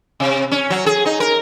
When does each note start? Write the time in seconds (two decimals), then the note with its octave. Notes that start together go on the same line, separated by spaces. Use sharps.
0.20 C3
0.51 C#4
0.70 F#3
0.86 G#4
1.06 D#4
1.20 A#4